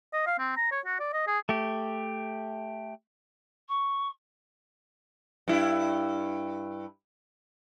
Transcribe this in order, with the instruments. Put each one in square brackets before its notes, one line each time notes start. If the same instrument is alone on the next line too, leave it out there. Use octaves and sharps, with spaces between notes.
[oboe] D#5
F5
C4
A#5
C#5
F#4
D5
D#5
G#4
[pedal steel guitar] A3 G4
[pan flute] C#6
[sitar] G2 E4